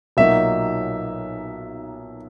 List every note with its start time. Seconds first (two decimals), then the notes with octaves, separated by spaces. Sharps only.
0.17 B1 A#2 F#3 A#3 D#4 E5